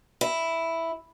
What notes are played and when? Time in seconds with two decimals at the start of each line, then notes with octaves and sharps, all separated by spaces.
0.21 E4